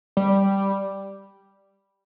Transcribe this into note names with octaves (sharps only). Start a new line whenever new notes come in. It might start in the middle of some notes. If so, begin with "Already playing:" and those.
G3